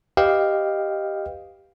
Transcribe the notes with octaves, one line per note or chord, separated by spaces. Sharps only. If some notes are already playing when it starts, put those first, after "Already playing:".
G4 B4 D#5 F5 G5